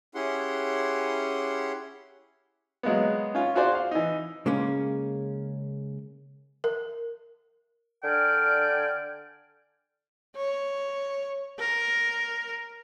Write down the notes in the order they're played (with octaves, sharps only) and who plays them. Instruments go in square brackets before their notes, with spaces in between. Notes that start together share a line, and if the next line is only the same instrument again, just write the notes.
[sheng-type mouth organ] C#4 E4 G4 G#4 F#5 C6
[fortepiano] F#3 G#3 A#3 B3
C#4 F4
F4 F#4 G#4 C5 D5
F5
E3 D#4
[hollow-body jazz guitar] C#3 G#3 A#3 C#4
[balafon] A#4
[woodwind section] D3 D5 G5 G#5 F6
[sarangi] C#5
A#4